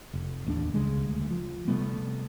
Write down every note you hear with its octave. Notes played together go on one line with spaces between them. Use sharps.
F1
A1 D#2 B3 D4
C#2 C#3 G3 G#3
D2
F3
C3 G3 A3 B3